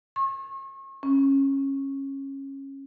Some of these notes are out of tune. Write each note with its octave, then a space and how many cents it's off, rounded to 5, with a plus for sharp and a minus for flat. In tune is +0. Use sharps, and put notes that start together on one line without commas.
C#6 -40
C#4 -20